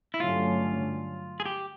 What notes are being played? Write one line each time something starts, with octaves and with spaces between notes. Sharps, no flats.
E4
G2 D3 F#3 A3 C#4 F4
G#4
G4